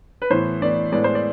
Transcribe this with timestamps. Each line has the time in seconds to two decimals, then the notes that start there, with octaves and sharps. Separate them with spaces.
0.22 B4
0.30 A2 E3 B3 C5
0.62 A2 E3 B3 D5
0.92 A2 G#3 B3 D5
1.04 C5
1.15 D5